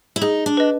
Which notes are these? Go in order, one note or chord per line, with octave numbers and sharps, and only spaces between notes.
E4
D#4 G#4
D4
B4 D#5